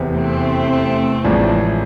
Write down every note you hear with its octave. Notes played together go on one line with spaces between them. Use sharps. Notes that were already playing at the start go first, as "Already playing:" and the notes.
Already playing: F1 E2 C3 E3
A3 C4
A1 A2 F3 G#3 D4